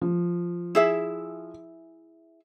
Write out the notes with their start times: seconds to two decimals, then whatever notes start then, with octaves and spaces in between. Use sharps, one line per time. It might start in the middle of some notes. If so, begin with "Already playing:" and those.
0.02 F3
0.75 E4 G#4 E5